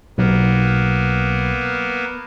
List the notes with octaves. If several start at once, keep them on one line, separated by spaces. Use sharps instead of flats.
B1 A#3 B3